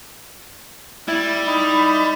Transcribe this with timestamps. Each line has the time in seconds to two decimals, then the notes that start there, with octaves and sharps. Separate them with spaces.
1.08 G3 E4
1.47 D#4 B5